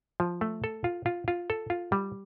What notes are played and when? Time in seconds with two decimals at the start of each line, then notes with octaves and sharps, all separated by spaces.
0.20 F3
0.41 A3
0.64 A4
0.84 F4
1.06 F4
1.28 F4
1.50 A4
1.70 F4
1.92 G3